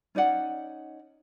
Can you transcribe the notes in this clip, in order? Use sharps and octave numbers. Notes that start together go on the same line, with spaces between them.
C#4 D#4 D5 F#5